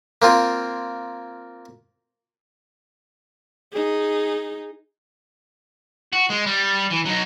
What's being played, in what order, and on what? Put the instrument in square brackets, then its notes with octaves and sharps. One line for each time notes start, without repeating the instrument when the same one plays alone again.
[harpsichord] A#3 C4 F4
[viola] D#4 G#4
[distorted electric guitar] F#4
G#3
G3
E3
F#3 D#4